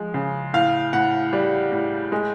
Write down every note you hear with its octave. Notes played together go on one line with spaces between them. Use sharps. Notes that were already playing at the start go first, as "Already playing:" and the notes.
Already playing: F3 G#3
C#3
A2 F5
A2 F#5
G3
A2
G#3